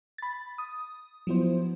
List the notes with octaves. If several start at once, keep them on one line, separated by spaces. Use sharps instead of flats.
B5 A6
D#6
F3 F#3 B3 E4 C5